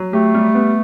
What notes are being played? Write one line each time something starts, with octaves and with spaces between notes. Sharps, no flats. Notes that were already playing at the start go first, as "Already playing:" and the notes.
Already playing: F#3
A3 G4
G3
B3